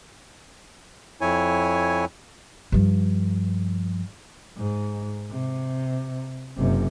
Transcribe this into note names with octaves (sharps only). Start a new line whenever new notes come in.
F2 E4 C#5 G#5
G2 F3
G#2
C3
F#1 C3